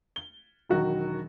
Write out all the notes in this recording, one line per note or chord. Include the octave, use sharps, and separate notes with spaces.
G7
E1 D#3 F#3 F#4